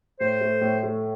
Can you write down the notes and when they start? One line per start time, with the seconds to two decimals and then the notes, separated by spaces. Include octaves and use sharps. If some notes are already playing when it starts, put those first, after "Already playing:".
0.20 A2 C5
0.41 A3
0.61 A2
0.83 A3